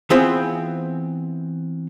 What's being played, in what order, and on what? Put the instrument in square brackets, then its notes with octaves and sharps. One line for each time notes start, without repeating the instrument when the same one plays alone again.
[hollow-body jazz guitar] E3 B3 C4 F4 G#4 C5